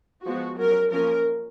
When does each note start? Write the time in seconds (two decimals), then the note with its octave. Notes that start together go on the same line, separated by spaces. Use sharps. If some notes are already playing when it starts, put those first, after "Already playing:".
0.25 F3 G#3 B3 F#4
0.58 F#3 C#4 A#4
0.92 F3 A#3 C#4 A#4